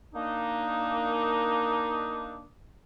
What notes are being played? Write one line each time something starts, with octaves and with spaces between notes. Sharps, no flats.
A#3 D4 D#4